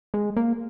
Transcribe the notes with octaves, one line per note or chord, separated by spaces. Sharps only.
G#3
A#3